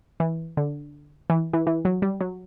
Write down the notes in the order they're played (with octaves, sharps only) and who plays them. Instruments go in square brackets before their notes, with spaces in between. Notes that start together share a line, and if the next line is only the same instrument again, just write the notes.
[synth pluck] E3
D3
E3
E3
E3
F#3
G3
F#3